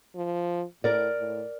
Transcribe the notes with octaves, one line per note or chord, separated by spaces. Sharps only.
F3
A2 A#4 D5
A2